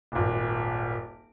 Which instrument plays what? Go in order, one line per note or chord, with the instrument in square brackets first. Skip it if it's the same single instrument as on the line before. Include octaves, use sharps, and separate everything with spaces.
[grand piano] D#1 G#1